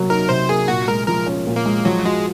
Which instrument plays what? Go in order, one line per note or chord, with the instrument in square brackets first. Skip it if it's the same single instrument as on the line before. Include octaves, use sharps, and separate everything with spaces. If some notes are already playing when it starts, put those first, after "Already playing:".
Already playing: [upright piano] C3 F#3 A#3
[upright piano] D#4 [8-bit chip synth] A#4
[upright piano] C3 [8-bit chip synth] C5
[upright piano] A#3 [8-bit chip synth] G#4
[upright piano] A#2 [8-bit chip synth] F#4
[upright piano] G#3 [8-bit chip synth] A#4
[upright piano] F3 [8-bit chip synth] A#4
[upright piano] C#4
A#2
[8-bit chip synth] A#3
[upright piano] G#3
[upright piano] F3 [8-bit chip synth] F#3
[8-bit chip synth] G#3 [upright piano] F#4